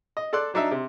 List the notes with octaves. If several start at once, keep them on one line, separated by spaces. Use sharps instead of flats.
D#5
A4 D5 C6 F#6
F#3 D4 D#4 E5
C3